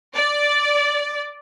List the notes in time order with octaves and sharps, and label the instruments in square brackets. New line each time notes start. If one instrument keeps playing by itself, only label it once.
[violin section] D5